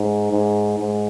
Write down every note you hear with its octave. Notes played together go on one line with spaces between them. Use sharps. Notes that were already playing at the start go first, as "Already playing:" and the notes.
Already playing: G#2
G#2
G#2